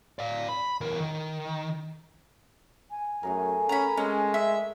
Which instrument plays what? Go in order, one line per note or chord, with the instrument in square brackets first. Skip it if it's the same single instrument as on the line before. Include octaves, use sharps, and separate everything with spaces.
[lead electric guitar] D5 F5
B5
E2 A#4
D#3
[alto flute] G#5
[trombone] F#2 [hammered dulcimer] A3 G#4 A#4
[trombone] C#4 [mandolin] A#5 B5
[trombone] G#3 [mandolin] C#4 [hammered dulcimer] A5
[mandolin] E5